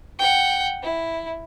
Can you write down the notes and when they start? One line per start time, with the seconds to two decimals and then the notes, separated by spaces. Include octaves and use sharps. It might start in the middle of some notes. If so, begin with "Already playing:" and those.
0.19 F#5 G5
0.83 E4